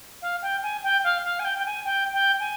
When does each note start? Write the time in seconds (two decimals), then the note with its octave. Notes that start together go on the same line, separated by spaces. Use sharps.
0.21 F5
0.42 G5
0.62 G#5
0.83 G5
1.03 F5
1.24 F5
1.39 G#5
1.44 G5
1.58 G5
1.65 G#5
1.84 G5
2.12 G5
2.39 G#5